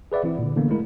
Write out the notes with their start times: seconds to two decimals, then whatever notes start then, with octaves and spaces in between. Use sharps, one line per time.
0.12 G#4 B4 D5 E5 F#5
0.24 E3 C4 E4
0.39 A#2 D3
0.56 D3 E3 A#3 B3
0.70 G#3 A3 E4 A#4